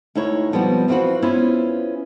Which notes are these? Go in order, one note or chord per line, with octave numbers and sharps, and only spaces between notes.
D2 D#4 E4 C#5
B2 F3 G3 B3 C4
E3 F3 C4 D#4 F#4 B4
B3 C#4 E4 F4 C5